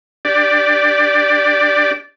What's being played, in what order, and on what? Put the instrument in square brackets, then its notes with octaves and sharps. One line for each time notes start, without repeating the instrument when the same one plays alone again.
[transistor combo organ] D4 G4 D5